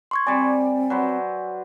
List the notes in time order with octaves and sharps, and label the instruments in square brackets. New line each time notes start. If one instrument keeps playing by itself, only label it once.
[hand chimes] C6 C#6 G#6
[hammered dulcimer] G3 D5 [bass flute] C4 [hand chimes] G#5
[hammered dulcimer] F#3 B4 C5